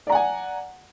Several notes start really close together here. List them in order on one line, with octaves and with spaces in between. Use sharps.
D5 A#5 F#5 G#5